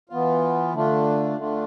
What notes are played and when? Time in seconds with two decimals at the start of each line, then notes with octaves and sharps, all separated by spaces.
0.09 E3 B3 F4
0.74 D3 A3 D4 F4
1.37 D3 A3 D4 F4